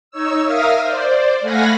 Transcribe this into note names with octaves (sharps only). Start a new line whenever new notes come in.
D#4 C#5 E6
A#4 E5 F5 D#6 F6
C5 D5
A3 F5 F#5 G#5 B5 A#6